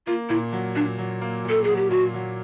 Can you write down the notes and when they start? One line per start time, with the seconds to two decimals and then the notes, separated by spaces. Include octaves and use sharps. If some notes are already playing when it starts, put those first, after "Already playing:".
0.07 A#3 F4
0.29 A#2 E4
0.53 F#3
0.75 A#2 D4
0.98 F#3
1.21 A#3
1.45 A#2 A4
1.64 F#3 G#4
1.77 G4
1.90 A#2 F#4
2.14 F#3